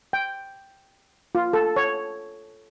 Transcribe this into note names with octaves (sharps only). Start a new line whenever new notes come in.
G5
F4
A4
C#5